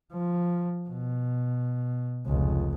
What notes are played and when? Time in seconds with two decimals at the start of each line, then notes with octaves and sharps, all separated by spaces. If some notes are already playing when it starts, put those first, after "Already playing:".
0.12 F3
0.89 B2
2.26 F1 C#2